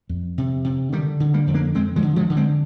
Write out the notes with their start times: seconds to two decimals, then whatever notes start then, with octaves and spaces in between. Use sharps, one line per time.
0.09 F2
0.38 C3
0.64 C3
0.92 D3 D#3 G3
1.20 D3
1.34 G3 A#3
1.47 F2
1.54 A#3 D4
1.75 F2 G#3 C4
1.96 F3 G#3
2.02 D3
2.16 F3 G#3
2.30 D3
2.37 G#3 C4